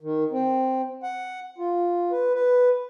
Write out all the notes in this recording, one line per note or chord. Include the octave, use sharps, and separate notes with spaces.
D#3
C4
F#5
F4
B4
B4